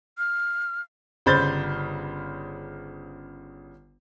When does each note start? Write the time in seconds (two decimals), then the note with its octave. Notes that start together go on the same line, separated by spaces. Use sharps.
0.18 F6
1.26 G1 C#3 C5 B5 G6 A6